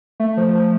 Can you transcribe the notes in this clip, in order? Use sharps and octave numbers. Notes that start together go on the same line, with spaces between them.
A3
F3
F3